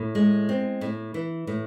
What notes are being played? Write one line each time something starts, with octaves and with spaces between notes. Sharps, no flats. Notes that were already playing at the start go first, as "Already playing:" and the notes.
Already playing: A2
G#3
C4
A2
E3
A2